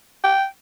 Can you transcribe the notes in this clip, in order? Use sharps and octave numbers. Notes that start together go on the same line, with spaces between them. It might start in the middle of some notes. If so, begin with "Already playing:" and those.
G5